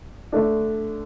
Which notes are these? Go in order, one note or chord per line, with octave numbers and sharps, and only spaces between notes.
D3 A3 D4